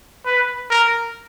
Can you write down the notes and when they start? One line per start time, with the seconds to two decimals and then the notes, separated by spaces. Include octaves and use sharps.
0.26 B4
0.70 A#4